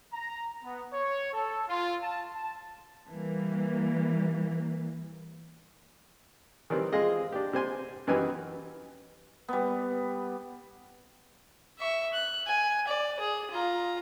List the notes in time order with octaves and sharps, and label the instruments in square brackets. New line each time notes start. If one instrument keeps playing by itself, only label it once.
[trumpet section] A#5
B3
C#5
A4
F4
A5
A5
[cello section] E3 G3 A#3
[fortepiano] D#3 E3 G3 C4
G#3 C4 F4 G#4 D#5
D4 G4
C3 C5 G#5 C6
F#2 E3 D#4 G4 B4 G#5
[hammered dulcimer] G3 B3
[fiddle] E5 C#6
F#6
G#5
D5
G#4
F4 A#5